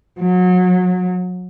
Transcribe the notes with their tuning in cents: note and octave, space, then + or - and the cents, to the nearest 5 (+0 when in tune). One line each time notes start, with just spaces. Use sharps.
F#3 -30